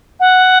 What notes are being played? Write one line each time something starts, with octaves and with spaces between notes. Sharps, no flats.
F#5